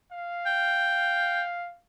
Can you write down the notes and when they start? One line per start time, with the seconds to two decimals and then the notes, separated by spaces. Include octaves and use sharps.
0.12 F5
0.46 G5